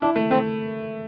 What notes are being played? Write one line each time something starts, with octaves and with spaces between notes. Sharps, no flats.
D4 E4
A3
A3 C4